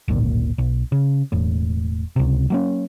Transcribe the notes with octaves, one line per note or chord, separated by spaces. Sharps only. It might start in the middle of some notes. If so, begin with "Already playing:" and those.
D1 G#1 A#2
B1
C#3
E1 A2
C#2 C3
F#3 A#3 C#4